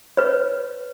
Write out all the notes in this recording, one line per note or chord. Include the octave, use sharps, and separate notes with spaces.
B4 C#5